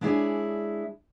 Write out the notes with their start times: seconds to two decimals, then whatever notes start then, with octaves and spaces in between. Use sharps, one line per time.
0.01 G#3 D4 E4 G#4 C#5 D5